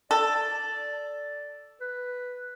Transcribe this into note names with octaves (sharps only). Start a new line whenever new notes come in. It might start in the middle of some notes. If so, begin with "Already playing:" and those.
A4 D5
B4